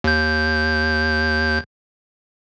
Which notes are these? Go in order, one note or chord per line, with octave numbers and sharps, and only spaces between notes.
D#2 G6